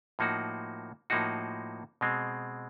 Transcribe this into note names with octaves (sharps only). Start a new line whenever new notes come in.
A2 F3 A#3 D#4 F#4
A2 F3 A#3 D#4 F#4
B2 G#3 C4